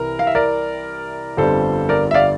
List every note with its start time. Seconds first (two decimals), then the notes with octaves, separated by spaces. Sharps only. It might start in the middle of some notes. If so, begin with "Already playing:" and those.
Already playing: C2 C3 E3 A#4
0.19 F5
0.27 E5
0.35 A#4 D5
1.37 G1 F2 D3 G3 A4 C5
1.89 A#4 D5
2.11 E5
2.14 D5 F5